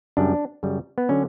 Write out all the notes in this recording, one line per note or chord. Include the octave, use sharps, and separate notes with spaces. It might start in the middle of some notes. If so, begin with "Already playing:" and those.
F#2 C#3 G3 D4
F#2 C#3 G3
B3
D3 F#3 C#4